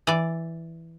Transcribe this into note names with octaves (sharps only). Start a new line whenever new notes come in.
E3 D5